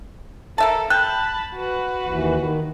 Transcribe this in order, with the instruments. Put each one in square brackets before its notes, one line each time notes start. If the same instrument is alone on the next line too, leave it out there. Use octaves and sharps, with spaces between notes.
[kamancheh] A4 [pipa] A#4 E5 A5
[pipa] G5 [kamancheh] A5 B5 [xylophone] F#6
[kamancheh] F#4 B4
[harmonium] D#2 E3
D#3